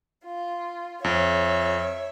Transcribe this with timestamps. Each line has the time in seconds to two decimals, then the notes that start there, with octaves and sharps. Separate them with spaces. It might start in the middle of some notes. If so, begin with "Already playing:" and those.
0.25 F4
1.04 F2 C#5 E5